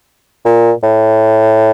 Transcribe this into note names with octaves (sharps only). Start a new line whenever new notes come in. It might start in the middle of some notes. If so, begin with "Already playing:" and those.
A#2
A2